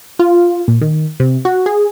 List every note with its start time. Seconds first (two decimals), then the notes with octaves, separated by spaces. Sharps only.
0.19 F4
0.68 A#2
0.81 D#3
1.20 C3
1.45 F#4
1.66 G#4